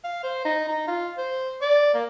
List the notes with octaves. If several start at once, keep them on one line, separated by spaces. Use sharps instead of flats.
F5
C5
D#4
D#4
F4
C5
D5
A#3